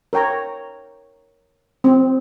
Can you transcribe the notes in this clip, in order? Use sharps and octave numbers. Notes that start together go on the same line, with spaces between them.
A#4 C#5 G5 A#5
C4